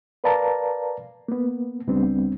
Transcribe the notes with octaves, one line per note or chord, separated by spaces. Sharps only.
A#4 B4 D5 F5 A5 A#5
A#3 B3
C#2 G3 B3 C4 D4